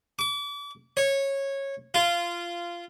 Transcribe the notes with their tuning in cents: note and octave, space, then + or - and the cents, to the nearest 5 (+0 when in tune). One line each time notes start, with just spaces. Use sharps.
D6 -35
C#5 -15
F4 -15